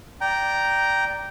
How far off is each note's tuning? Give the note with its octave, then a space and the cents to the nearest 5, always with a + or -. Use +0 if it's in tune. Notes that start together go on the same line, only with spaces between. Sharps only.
D5 +0 G5 -10 A#5 +5